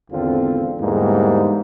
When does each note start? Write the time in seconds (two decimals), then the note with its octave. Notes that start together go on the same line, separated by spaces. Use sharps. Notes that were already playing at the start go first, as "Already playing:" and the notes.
0.11 G#1 E2 D3 C4 F4
0.80 E2 G#2 D3 G3 A#3